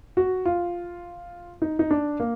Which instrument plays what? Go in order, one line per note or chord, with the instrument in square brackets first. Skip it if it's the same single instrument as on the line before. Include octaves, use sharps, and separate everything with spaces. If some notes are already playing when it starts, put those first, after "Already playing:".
[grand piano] F#4
F4
D#4
D#4
D4
A#3